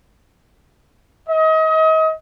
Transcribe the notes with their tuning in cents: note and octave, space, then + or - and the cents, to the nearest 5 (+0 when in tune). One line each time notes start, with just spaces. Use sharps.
D#5 +35